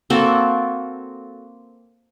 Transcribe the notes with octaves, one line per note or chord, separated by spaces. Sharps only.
A#3 C4 F#4 A4